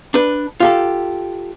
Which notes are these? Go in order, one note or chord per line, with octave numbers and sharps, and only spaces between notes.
D4 B4
F4 G4 A4